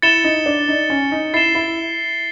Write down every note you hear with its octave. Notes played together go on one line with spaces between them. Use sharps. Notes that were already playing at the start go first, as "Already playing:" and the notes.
E4 A6 C#7 E7 G7
D#4
D4
D#4
C#4
D#4
E4 A6 C7 E7 G7
E4